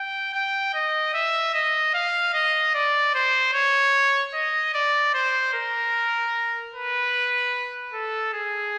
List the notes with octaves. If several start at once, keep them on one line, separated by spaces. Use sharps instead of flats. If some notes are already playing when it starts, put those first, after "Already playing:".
Already playing: G5
G5
D#5
E5
D#5
F5
D#5
D5
C5
C#5
D#5
D5
C5
A#4
B4
A4
G#4